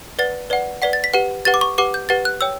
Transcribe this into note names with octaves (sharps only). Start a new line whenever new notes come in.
B4 D5 F#5 A6
B4 D5 F#5
B4 D5 F#5 B6
A6
B6
G4 B4 F#5
G4 B4 F#5 A6
D6
C#6
G4 B4 F#5 D6
G6
G4 B4 F#5 A6
F#6
C#5 G5 E6